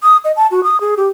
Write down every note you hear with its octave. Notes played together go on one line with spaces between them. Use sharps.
D#6
D#5
A5
F#4
D#6
G#4
G4